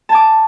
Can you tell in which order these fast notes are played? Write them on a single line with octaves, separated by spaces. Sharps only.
A5 G#5 D6